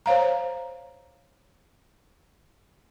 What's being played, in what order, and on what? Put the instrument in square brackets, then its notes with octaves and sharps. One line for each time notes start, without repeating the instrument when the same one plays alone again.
[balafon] C5 C#5 F5 A#5